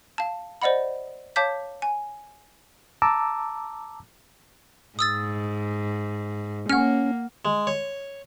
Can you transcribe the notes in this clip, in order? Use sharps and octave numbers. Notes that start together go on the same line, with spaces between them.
F5 A5
C5 D5 D#5 F#5 B5
C#5 F5 A5 D6 G6 B6
G#5
A5 A#5 D6 E6
G#2 D#6 E6 A6
A#3 C#4 F#5 F6
G#3
C#5